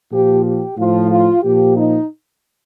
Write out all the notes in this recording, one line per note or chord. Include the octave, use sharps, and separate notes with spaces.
A#2 F3 G4
G4
A2 F3 F4
F4
A#2 F3 G4
D#4